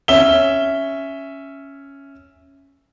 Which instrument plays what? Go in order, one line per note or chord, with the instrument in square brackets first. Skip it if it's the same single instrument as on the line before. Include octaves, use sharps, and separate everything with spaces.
[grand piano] C#4 E5 G7